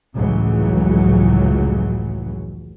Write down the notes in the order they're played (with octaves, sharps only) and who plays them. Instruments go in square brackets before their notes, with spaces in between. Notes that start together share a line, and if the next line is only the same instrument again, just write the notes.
[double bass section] F1 C#2 A2 C#3 E3 F#3